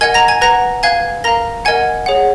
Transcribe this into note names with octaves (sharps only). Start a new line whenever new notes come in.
A#4 D#5 F#5 G#5 G#6
A#5 A#6
G#5 G#6
B4 F#5 A#5 A#6
B4 F5 G#5 G#6
A#4 F5 A#5 A#6
A#4 D#5 F#5 G#5 G#6
G#4 C#5 F#5